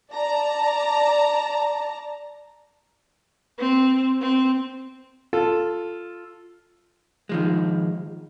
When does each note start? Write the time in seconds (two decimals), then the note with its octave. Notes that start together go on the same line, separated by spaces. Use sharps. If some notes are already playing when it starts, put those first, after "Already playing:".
0.12 D5 A5 A#5
3.58 C4
4.21 C4
5.33 F4 A4
7.29 D#3 F3 G#3